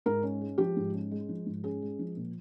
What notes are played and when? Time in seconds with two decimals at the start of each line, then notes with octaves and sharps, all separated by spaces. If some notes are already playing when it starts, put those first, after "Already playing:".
0.06 G#2 A#4
0.23 C#4
0.41 G#3
0.58 F3 G4
0.77 G#2
0.94 C#4
1.11 G#3
1.29 F3
1.46 G#2
1.64 C#4 G#4
1.82 G#3
1.99 F3
2.17 A#2